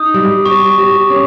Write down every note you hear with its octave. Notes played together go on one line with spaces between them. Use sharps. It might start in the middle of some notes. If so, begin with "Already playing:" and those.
Already playing: D#4 D#6
G3
G4 C#6
G4
C#4